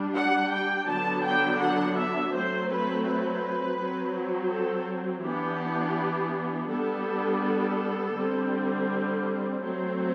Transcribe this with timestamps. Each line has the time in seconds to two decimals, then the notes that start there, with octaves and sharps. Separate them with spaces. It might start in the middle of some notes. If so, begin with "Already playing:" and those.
Already playing: G3 D4
0.15 F#5
0.51 G5
0.88 D3 F#3 B3 D4 A5
1.25 G5
1.61 F#5
1.97 E5
2.33 F#3 A3 C4 C5
2.70 B4
3.06 B4
3.79 F#3 C4
4.52 A4
5.24 E3 B3 D4 G4
6.70 G3 B3 D4 A4
7.43 A4
8.16 D3 G3 C4
9.61 F#3 A3 C4